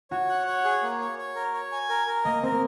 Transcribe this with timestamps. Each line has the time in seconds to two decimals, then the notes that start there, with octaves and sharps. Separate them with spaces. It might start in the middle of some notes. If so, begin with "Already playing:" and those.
0.11 F#4 C#5
0.29 F#5
0.47 C#5
0.65 G#4
0.83 A#3
1.00 C#5
1.19 C#5
1.36 A#4
1.54 C#5
1.72 G#5
1.89 A#4
2.07 A#4
2.25 A#3 D#5
2.43 C4 A#4
2.51 A#3